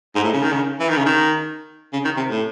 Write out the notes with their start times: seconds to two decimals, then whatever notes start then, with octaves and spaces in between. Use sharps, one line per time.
0.15 G#2
0.24 A2
0.33 C#3
0.42 D#3
0.53 C#3
0.80 E3
0.89 D#3
0.97 C#3
1.06 D#3
1.93 C#3
2.05 D#3
2.17 C3
2.30 A2